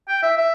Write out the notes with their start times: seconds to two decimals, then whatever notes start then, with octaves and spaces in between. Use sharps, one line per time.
0.08 G5
0.23 E5
0.37 E5